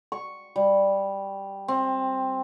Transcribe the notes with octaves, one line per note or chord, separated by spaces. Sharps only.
C#6
G3
C4